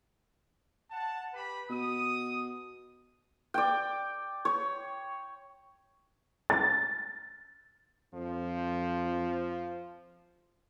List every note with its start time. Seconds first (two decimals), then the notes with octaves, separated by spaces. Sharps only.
0.91 F#5 A5
1.33 G4 B4 B5
1.70 B2 D#6
3.54 D5 G5
4.45 C#5
6.50 A6
8.13 F2 F3